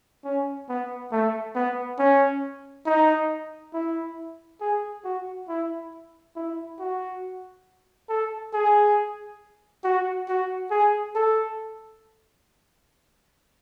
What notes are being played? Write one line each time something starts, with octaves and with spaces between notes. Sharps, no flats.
C#4
B3
A3
B3
C#4
D#4
E4
G#4
F#4
E4
E4
F#4
A4
G#4
F#4
F#4
G#4
A4